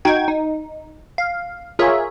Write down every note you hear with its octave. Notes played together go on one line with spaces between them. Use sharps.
D#4 F#4 G5 G#6
D#4
F5
F4 G#4 A#4 C#5 E5